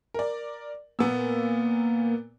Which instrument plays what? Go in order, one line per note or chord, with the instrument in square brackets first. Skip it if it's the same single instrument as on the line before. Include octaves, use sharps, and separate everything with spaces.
[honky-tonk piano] A#4 D5
[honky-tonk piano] A#2 B3 E6 [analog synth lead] A#3